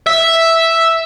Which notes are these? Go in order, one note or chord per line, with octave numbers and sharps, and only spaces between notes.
E5